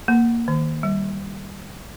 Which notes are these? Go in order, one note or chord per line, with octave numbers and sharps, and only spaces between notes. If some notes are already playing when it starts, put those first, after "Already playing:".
A#3
D#3
G3